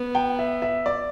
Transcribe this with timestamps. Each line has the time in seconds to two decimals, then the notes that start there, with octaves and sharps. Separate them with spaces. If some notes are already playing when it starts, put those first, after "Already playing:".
Already playing: B3
0.15 G5
0.39 E5
0.62 E5
0.86 D5